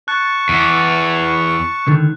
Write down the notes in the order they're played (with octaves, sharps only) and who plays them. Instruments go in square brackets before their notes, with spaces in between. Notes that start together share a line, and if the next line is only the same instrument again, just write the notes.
[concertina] A5 C#6 [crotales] F#6
[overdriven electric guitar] E2
[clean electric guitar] C#2 D3 D#3